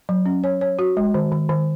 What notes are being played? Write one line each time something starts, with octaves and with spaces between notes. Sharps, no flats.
F#3
C#4
C#5
C#5
F#4
G#3
D#3
D#3
D#3